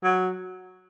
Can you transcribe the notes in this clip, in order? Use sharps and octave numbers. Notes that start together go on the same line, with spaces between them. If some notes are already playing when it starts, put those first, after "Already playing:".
F#3